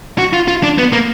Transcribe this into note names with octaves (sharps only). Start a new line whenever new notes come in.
F#4
F4
F4
D4
B3
A#3